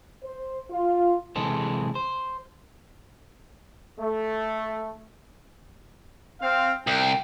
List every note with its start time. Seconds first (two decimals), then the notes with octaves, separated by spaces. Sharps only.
0.23 C5
0.70 F4
1.36 C3 E3 G#3 G#4 A4 C5
1.95 C5
3.99 A3
6.42 C4 F5
6.87 C2 G5